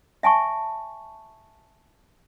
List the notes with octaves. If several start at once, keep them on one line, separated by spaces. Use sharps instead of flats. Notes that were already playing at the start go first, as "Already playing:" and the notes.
E5 G#5 A5 C#6